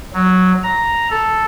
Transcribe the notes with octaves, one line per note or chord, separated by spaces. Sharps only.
F#3
A#5
A4